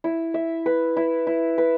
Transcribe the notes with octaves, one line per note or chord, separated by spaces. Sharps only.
E4
E5
B4
E4
E4
B4